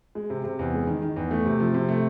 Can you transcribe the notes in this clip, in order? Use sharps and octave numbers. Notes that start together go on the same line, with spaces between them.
G#3
C3
C3
E2
G#3
D#3
D#3
E2
A3
C3
F3
C3
A3